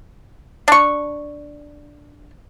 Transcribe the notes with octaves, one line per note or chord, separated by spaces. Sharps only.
D4 C#6